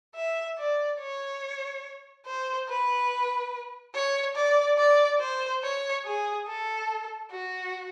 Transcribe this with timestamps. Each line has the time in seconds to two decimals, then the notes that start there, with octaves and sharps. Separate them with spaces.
0.15 E5
0.58 D5
1.00 C#5
2.26 C5
2.69 B4
3.95 C#5
4.36 D5
4.78 D5
5.20 C5
5.63 C#5
6.05 G#4
6.47 A4
7.31 F#4